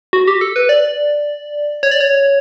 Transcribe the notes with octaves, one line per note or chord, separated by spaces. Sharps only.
F#4
G4
A4
B4
D5
C#5
D5
C#5